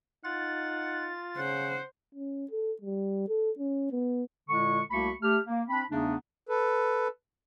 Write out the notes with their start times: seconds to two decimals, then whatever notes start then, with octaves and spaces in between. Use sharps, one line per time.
0.24 D#4 F4 F#5 A6
1.37 C#3 C5 F#5
2.15 C#4
2.51 A4
2.82 G3
3.28 A4
3.58 C#4
3.92 B3
4.49 A#2 D3 G#3 E4 C#6
4.90 C2 A3 A#3 F#4 B5 C#6
5.22 A3 G4 F6
5.46 A#3
5.68 C4 D4 B5
5.90 E2 C#3 A3 B3 D4 D#4
6.49 A4 B4